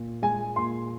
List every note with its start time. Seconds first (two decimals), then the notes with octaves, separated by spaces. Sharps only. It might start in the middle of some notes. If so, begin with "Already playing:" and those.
Already playing: A#2
0.22 G#3 G#5
0.56 A#2 C6